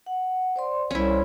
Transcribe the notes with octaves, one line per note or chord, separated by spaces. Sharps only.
F#5
C5 D5 C6
C2 C#4 E4 C5 C6